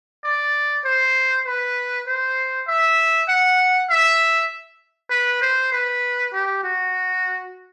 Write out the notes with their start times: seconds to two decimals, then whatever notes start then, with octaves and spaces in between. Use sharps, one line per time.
0.24 D5
0.85 C5
1.46 B4
2.07 C5
2.68 E5
3.29 F#5
3.90 E5
5.11 B4
5.42 C5
5.72 B4
6.33 G4
6.64 F#4